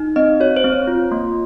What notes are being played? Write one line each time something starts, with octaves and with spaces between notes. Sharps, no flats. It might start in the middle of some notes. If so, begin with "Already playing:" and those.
Already playing: D#4
C4 D#5
F#4 C#5
C5
C4
C#5
F4
A#3